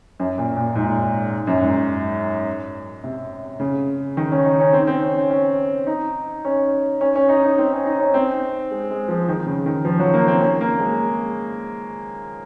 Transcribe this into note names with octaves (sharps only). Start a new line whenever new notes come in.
F#2
A#2
A#2
G#2
F#2
G#2
C3
C#3
D#3
C#4
D#4
C#4
C4
C4
C#4
C#4
C#4
D#4
C#4
C#4
C#4
D#4
D#4
C4
C#4
D#4
C#4
C4
G#3
G#3
F3
D#3
C#3
D#3
F3
F#3
A#3
C4
C#4
A#3
G#3